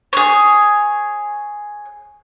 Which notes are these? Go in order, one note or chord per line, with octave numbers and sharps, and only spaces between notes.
G#4 C#5